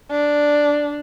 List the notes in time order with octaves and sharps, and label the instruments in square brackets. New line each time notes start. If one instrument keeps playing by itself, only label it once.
[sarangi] D4